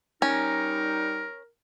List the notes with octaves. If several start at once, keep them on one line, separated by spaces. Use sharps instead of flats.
G3 C#4 D#4 A#4